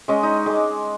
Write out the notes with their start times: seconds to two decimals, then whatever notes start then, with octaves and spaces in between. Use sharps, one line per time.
0.08 G#3 C#4 D#5
0.23 D#4
0.46 G#3 D6